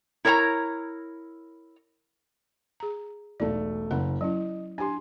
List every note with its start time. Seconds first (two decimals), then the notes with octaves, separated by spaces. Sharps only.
0.25 E4 A#4 C#5 A5 A#5
2.80 G#4 A#5
3.40 E1 B1 A3 D5
3.91 F#1 A#4 F#5
4.21 F#3 C#4 E4 D#5
4.78 D4 G4 G#5 C6